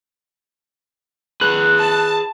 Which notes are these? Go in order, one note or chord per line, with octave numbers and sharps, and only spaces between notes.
G#4 B4 F#6
A5